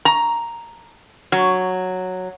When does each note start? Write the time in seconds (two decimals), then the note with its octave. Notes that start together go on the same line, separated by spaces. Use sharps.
0.05 A#5
1.32 F#3